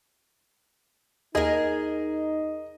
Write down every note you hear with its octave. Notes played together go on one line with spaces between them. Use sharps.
D#2 D#4 G#4 A#4 D#5